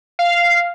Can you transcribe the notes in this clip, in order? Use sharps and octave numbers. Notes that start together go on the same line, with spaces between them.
F5